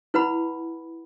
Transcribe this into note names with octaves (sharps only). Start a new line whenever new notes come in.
E4 B4 F#5 B5